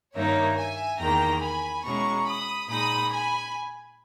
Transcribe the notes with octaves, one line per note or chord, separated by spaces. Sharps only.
G2 D#3 A#3 D#4 C#5 E5
E5 G#5
E2 D#3 A#3 G5 A#5
G#5 B5
B2 G#3 C#4 E4 A#5 C#6
B5 D#6
A#2 G#3 D#4 B5 D#6
G#5 B5